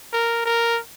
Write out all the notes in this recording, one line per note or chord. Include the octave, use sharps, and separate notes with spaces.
A#4
A#4